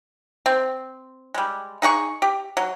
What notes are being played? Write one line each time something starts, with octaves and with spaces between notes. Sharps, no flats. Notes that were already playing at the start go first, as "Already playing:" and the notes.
C4
G3 G#3
D#4 G#4 F#5 C#6
G4
F#3